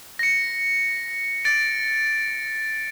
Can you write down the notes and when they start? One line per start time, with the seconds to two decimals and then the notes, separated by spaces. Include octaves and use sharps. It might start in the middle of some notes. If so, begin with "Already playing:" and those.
0.19 A#6 C#7
1.45 A6 D7